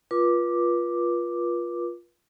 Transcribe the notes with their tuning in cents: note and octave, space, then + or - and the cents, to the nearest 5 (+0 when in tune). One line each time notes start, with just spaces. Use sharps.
F4 +0 B4 -35 D6 +0